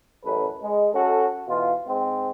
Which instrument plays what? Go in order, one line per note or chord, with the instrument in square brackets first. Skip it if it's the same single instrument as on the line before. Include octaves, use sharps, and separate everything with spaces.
[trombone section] A1 F#2 A4 B4
G#3
C#4 F#4 A4
B2 E3 F4
G#2 G#3 C4